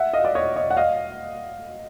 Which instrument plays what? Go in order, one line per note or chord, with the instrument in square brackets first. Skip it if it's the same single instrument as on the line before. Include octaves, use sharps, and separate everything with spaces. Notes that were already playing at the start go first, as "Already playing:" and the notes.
Already playing: [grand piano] E5 F#5
D#5 F5
D5
C#5 D#5
C#5 D#5
F#5
D#5 F5